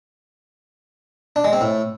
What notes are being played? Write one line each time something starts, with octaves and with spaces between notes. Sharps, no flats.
D4
G#3
C4
A2